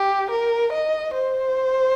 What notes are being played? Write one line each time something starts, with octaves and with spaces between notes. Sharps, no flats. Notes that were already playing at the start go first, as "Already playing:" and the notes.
Already playing: G4
A#4
D#5
C5